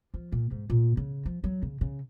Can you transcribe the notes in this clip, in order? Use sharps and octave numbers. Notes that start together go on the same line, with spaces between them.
F3
A#2
G#2
A#2
C#3
F3
F#3
C#3
C#3